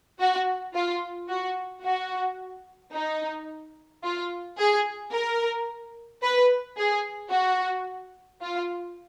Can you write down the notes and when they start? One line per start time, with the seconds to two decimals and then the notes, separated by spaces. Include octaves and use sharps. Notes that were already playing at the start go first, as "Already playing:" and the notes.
0.20 F#4
0.74 F4
1.29 F#4
1.84 F#4
2.93 D#4
4.03 F4
4.58 G#4
5.13 A#4
6.23 B4
6.78 G#4
7.32 F#4
8.42 F4